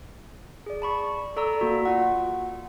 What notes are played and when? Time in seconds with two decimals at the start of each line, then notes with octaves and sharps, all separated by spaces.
0.66 G#4 D5
0.82 A5 B5 C#6
1.37 A4 D5 A#5 C#6 E6
1.60 A#3 F#4 A#5
1.86 F4 F#5